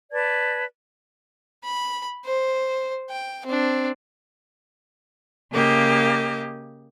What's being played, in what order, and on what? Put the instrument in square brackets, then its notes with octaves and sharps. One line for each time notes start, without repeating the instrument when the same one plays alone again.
[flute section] B4 D5 A5 G#6
[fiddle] B5
C5
G5
C4 D4
[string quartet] C#3 A#3 G4 D#5